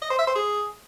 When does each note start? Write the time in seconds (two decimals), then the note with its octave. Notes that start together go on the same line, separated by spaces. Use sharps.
0.02 D#5
0.10 C5
0.19 E5
0.27 C5
0.35 G#4